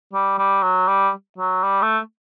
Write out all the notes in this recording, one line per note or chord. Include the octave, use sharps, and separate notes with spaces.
G3
G3
F#3
G3
F#3
G3
A3